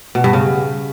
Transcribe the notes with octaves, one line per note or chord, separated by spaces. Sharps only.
B2
G2
C#3